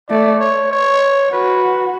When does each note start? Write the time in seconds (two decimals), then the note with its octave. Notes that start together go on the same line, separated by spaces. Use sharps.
0.09 A3 D5
0.40 C#5
0.71 C#5
1.32 F#4 B4